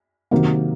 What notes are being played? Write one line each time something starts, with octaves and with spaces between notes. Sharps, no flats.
C3 D#3 F#3 A#3